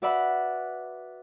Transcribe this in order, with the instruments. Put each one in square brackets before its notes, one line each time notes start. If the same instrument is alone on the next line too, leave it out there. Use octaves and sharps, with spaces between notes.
[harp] F#4 B4 D5 E5 F#5 B5